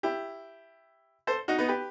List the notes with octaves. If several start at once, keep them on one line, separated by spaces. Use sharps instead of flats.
E4 G4
A4 C5
D#4 F#4
B3 D#4
G4 B4